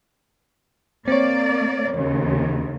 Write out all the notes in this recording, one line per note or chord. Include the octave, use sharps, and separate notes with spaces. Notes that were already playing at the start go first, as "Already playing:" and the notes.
A#3 C4 C#5 D5
D#2 C#3